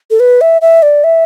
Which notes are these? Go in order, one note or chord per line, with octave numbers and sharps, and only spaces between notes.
A4
B4
E5
E5
D5
E5